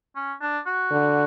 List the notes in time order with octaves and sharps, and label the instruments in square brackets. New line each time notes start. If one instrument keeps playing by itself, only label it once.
[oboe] C#4
D4
F#4
[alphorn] D3